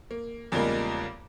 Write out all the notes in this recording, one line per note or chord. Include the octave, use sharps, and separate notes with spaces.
A#3
E2 C#3 F3 G3 G#3 A#3